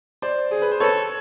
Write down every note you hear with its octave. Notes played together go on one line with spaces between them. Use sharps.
C5 D5
G#4
B4
C5
A4 B4 C#5